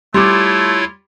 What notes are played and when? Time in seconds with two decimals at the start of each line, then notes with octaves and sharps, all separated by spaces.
0.14 G3 A3 E4 F4 C#5 C6 D6